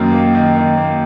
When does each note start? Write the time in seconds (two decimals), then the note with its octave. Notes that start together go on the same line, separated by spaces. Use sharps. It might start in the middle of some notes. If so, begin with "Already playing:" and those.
Already playing: F#2 D#3 A#3
0.12 A#3
0.35 D#3
0.57 D#3
0.77 A#3